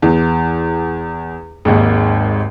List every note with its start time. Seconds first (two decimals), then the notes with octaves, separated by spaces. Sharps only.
0.02 E2
1.65 G#1 D#2 G#2